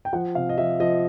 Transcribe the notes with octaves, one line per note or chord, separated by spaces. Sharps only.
G5
F3 F#5
C3 F5
D#5
F3 E5
F3 D#5